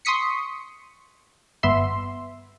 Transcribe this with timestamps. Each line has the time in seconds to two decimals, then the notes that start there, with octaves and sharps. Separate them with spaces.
0.05 C6 C#6 D#6 B6 C#7
1.63 G1 B3 E5 C6